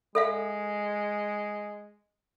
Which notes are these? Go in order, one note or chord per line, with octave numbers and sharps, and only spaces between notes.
G#3 A4 E5 F5